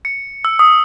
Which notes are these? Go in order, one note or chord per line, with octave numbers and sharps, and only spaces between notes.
C#7
E6
D#6